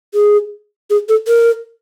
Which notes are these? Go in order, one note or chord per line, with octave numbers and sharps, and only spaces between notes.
G#4
G#4
A4
A#4